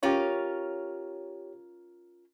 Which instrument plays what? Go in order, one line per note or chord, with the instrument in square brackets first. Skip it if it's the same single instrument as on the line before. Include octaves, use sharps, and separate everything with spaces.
[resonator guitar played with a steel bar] C#4 F4 A#4 [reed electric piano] G4 C#5